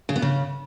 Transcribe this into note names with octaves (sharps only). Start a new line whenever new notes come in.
C#3
B3
C#3